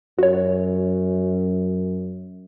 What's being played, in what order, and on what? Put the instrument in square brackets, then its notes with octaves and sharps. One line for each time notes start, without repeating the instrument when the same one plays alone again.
[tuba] F#2 [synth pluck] F#4 C#5